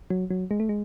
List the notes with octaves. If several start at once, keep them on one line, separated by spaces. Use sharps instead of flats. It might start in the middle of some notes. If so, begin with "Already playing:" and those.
F#3
F#3
G#3
A3
G#3